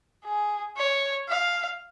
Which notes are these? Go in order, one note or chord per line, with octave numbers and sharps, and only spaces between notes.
G#4
C#5
F5